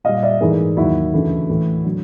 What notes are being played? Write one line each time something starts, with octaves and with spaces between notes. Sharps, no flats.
A#2 G3 D#5 F5
D5 E5
G#2 E3 A3 G#4 A#4
D#2 D#3 F#3 E4 F#4
D2 C#3 E3 A3
A2 E3 A3
D3 F#3